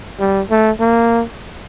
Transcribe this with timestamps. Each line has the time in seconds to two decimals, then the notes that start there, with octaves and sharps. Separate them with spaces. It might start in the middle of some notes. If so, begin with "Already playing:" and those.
0.19 G3
0.50 A3
0.80 A#3